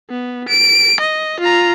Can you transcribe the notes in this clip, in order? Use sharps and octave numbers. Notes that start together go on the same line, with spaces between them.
B3
D7
D#5
F4 A#5